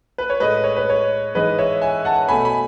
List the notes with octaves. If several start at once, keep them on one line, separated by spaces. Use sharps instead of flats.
B4
C#5
A2 G#3 B4 D#5
C#5
B4
C#5
G#2 E3 G#3 B4 D#5
C#5 E5
E5 G#5
F#5 A5
B2 A3 G#5 B5
G#5 B5